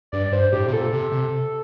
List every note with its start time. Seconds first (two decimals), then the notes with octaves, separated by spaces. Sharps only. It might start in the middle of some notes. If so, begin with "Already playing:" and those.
0.12 G2 D5
0.26 D5
0.32 G2 C5
0.52 A2 G4
0.68 C3
0.72 A#2 A4
0.93 C3
1.12 C3